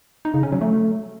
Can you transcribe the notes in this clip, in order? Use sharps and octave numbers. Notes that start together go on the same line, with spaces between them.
D#4
C#3
C#4
F#3
A3